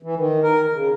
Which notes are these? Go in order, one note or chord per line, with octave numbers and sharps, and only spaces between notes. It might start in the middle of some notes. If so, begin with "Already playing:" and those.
E3
D#3
A#4
C#3